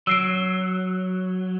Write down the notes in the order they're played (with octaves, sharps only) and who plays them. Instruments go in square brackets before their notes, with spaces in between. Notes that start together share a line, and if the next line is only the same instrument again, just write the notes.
[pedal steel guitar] F#3 [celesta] E6 C7 D7